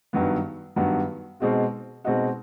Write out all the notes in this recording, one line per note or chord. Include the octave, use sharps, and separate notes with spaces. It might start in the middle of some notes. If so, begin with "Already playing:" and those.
G2 D#3 F#3 B3
G2 D#3 F#3 B3
B2 G#3 C4 D#4 F#4
B2 G#3 C4 D#4 F#4